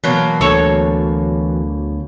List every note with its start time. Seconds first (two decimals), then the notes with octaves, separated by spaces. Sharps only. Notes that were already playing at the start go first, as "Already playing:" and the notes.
0.04 B2 E3 F#3 A#3
0.41 D2 A4 C#5